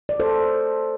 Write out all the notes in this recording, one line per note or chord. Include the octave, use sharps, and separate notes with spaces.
D5
A4 C5